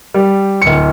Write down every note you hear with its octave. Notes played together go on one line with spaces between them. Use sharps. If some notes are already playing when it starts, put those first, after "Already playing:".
G3
D1 C#7